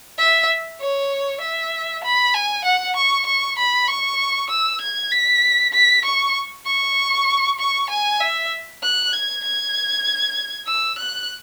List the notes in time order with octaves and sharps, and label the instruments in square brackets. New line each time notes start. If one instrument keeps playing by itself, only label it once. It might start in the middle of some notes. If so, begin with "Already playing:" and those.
[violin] E5
C#5
E5
B5
G#5
F#5
C#6
C#6
B5
C#6
E6
G#6
B6
B6
C#6
C#6
C#6
G#5
E5
F#6
G#6
G#6
E6
F#6